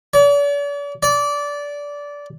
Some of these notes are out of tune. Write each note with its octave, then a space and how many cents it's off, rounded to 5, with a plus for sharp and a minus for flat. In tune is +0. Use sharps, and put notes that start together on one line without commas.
D5 -45
D5 -20